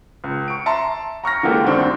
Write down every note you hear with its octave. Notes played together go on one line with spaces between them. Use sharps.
C#2
C#6 D7
E5 A5 A#5 C6
A#5 C#6 F6 A#6
D3 E3 G#3 A#3 G4 A4
D2 G2 D#3 C4 D4